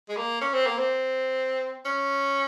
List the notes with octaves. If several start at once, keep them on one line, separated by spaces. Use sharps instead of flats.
G#3
A#3
C#4
C4
A#3
C4
C#4